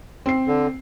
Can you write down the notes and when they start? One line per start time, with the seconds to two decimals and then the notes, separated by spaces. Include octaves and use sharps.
0.26 C4 C7
0.47 D3